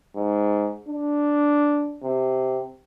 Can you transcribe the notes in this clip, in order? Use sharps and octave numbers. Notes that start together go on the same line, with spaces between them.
G#2
D4
C3